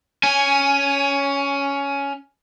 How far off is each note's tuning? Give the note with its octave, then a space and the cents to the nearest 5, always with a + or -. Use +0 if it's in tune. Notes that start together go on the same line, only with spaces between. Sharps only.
C#4 +10 G#5 +0